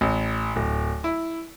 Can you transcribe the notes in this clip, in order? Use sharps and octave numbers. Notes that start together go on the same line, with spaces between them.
A1
D1
E4